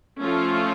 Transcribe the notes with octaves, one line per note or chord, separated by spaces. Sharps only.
F3 A3 C#4 F4